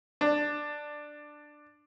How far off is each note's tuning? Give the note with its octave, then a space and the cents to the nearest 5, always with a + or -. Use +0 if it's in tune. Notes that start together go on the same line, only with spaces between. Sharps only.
D4 +10